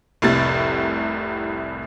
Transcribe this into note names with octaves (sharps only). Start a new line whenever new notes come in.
F1 C2 A2 C3 A6